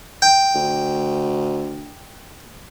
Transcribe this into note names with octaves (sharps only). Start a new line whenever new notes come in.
G5
D2